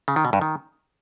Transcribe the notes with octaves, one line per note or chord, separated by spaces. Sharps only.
C#3
D#3
B2
G2
D#3